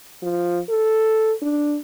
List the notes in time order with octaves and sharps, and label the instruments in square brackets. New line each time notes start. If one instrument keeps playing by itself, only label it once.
[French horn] F3
A4
D4